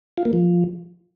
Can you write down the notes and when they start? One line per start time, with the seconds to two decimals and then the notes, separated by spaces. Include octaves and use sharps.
0.18 F4
0.25 A#3
0.33 F3